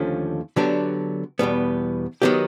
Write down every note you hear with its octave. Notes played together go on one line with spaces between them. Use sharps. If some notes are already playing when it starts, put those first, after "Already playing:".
Already playing: D#2 D3 F3 A3 C#4
D3 F#3 B3 D4 G4
E2 B2 G3 B3
D#3 F#3 B3 D#4 G4